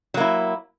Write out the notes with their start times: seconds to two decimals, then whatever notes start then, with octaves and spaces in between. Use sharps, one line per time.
0.14 F#3
0.17 A#3
0.20 E4